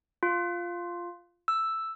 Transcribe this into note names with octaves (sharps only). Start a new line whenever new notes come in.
F4
E6